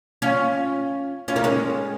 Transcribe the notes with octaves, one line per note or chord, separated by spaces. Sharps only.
C#4 F4
C#4 F4
A#3 D#4
G#3 C#4